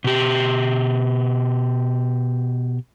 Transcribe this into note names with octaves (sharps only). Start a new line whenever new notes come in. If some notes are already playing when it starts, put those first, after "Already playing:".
B2 G4